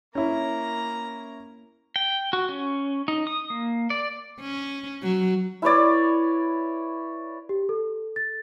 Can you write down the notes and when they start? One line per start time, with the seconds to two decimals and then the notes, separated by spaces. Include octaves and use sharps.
0.15 A#3 C#4 E4 A#5
1.96 G5
2.33 F#4
2.49 C#4
3.08 D#4
3.27 D#6
3.50 A#3
3.90 D5
4.41 C#4
5.03 F#3
5.62 E4 B4 C#5 D5
7.49 G4
7.69 A4
8.16 A6